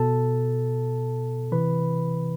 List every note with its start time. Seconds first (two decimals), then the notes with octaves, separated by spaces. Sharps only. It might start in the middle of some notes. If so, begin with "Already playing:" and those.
Already playing: B2 A4 A5
1.52 C3 E3 B4 B5